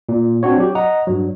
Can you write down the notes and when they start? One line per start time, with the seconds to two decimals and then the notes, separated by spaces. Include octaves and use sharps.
0.09 A#2
0.43 C4 D4 F#4 C#5
0.58 F#3 G4
0.75 D#5 F#5 A#5
1.07 G2 F#3